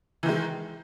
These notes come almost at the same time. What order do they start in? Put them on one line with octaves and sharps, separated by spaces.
E3 D#3 G#3